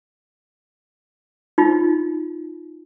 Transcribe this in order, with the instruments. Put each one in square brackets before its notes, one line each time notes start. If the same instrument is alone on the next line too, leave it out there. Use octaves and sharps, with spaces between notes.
[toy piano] D#4 F4